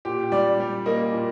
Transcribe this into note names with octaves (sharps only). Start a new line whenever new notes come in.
A#2 G4
G3 D5
G3
A#3 D#5
A#2